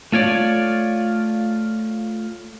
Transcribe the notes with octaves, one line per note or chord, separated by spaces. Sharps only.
A3 F4 C#5 D5